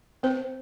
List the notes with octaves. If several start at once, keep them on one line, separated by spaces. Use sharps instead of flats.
C4 C5